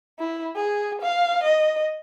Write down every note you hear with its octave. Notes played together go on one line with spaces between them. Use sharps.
E4
G#4
F5
D#5